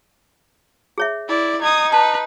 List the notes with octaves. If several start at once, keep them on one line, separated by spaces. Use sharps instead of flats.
G#4 C#5 E5
E4 D5
D#4 D#6 G#6
B4 A5